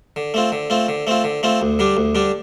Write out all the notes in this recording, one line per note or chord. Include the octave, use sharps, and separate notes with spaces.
D3
A3 C4 F4
D3
A3 C4 F4
D3
A3 C4 F4
D3
A3 C4 F4
D2
D3 G3 D4
D2
D3 G3 D4